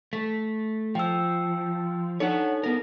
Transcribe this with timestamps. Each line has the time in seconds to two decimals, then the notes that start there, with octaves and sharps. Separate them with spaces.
0.13 A3 B6
0.95 F3 G5 E6
2.20 D4 D#4 A4 C#5 F#5
2.63 B3 A#4